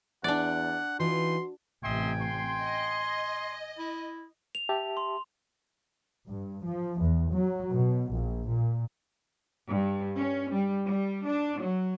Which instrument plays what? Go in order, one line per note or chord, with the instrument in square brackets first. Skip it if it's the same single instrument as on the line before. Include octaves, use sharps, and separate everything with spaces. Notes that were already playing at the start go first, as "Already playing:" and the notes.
[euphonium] E2 [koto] D4 D5 [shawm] F#5
[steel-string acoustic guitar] E3 D#4 F4 [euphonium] F#4 [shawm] C6
[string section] A1 C3 [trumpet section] D#5 E5 C6 [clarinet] G5 [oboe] G#5
[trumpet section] C6
[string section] D#5
[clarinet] E4
[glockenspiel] F7
[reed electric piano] G4 E5 A5
[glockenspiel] C6
[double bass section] G2
F3
E2
F#3
B2
A#1
A#2
[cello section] G2
C#4
G3
G3
D4
F#3